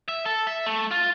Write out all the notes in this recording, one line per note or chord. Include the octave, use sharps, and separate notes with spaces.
E5
A4
E5
A3
F4